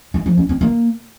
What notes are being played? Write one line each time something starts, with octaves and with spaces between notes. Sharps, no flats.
G#3
F3
C#4
C4
A#3